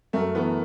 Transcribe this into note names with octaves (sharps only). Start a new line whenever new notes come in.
F#2 A3
E3 B3